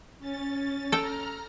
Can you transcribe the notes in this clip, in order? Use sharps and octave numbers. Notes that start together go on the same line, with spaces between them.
C#4 A6
A4 G5 A#5 F6